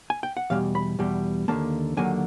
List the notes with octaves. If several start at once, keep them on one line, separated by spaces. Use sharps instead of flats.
G#5
G5
F#5
E2 B2 G3 F5
B5
E2 B2 G3
D#2 D3 F#3 A#3 A5
D#2 D3 F#3 A#3 G#5